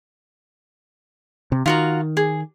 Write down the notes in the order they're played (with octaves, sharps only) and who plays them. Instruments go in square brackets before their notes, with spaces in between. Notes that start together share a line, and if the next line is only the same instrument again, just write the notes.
[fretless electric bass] C3
[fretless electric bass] D#3 [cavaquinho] F4 F#4 A#5
[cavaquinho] G#4